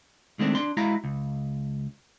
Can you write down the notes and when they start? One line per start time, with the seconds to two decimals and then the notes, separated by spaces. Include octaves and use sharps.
0.39 D#3 G#3 A3 C4 D4
0.55 D4 C6
0.77 G#3 E4 F#4 F5 A#5
1.04 C#2